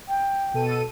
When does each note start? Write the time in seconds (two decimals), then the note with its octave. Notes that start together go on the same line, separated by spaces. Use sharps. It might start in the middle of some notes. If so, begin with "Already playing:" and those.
0.08 G5
0.54 B2 A4 D#7